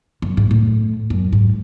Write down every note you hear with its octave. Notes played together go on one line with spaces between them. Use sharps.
F#2
G#2
A2
F#2
G#2